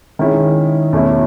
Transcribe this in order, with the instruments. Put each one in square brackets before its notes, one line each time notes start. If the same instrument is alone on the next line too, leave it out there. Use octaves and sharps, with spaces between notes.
[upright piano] D#3 G#3 C#4 E4
E2 B2 A3 C#4 E4